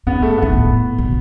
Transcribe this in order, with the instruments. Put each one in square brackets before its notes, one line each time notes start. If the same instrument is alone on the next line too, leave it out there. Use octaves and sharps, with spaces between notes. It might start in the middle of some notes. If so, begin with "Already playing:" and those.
[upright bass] G#2 [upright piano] B3
[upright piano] A3
[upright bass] G#2 [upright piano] B3
[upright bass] A2
B2